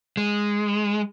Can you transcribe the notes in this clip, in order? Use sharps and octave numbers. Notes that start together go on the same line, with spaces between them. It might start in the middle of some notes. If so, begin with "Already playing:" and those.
G#3